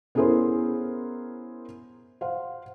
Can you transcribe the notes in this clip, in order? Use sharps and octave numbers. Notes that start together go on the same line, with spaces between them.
B3 C#4 E4 G#4 A#4 C5
C5 F5 F#5